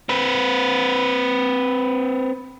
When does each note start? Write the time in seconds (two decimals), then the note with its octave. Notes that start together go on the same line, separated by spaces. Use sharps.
0.09 C4 B4